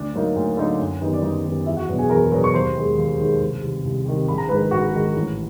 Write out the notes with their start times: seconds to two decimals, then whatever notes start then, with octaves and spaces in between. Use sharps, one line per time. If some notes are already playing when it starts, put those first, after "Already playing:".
Already playing: D2 D4 D5
0.13 D3 F#3 A#3 D#4
0.36 D2
0.57 D3 F#3 A#3 D#4
0.79 F#2
1.01 D#3 G3 B3 D#4
1.13 D5
1.23 F#2 D#4 D#5
1.45 D#3 G3 B3 D#4
1.66 E2 E4 E5
1.77 F#4 F#5
1.89 B2 F#3 B3 D4
1.99 G#4 G#5
2.09 E2 A#4 A#5
2.32 B2 F#3 B3 D4
2.44 C#6
2.54 D#2 C5 C6
2.75 D#3 G#3
2.97 D#2
3.19 D#3 G#3
3.41 C2
3.62 C3 D#3 G3
3.85 C2
4.06 C3 D#3 G3
4.28 A#1 B5
4.38 A#5
4.48 G#2 D#3 B4 B5
4.71 A#1 F#4 F#5
4.93 G#2 D#3
5.15 A1